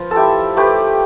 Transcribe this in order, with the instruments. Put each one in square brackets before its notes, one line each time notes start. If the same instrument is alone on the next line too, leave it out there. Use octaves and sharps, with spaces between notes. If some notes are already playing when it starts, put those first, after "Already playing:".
Already playing: [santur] F3 B4
A4
E4 G4
A3 G4 B4